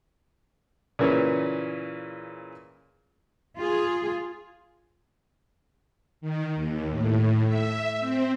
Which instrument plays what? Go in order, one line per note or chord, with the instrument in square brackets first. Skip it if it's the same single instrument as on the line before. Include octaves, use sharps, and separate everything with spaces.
[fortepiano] A#2 C#3 E3 C#4
[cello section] F4 G#4
[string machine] D#3
D#2
A2
E5
C4